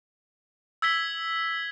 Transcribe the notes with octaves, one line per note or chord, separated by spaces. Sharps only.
E6 G#6 B6 G7